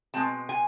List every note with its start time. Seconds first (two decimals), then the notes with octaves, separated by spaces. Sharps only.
0.14 B2 G#3 C4 A5
0.49 G#5